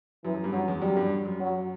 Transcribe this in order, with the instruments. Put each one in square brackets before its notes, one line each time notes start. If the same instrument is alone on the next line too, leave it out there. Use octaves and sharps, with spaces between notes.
[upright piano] F#2 [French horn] E3
[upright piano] F#2
G2
[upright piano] F#2 [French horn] F#3
[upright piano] E2
[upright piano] F#2 [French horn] G3
[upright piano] G2
F#2
[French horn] F#3